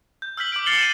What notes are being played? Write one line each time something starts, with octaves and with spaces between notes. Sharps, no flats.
G6
E6 F6 G6 B6 F#7
D6 G6 D7
F6 A6 C7 C#7 F#7 G7
D#7 E7